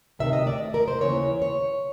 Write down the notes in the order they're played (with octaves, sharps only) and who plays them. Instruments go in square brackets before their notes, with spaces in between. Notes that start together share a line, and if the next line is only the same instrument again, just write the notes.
[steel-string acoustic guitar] D2 C3 D#3 E5
D#5
D5
A#4
C5
D#2 C#3 E3 C#5
C#5